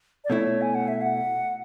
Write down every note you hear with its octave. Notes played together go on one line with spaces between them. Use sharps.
D5
B2 A3 E4 C#5
G#5
F#5
E5
F#5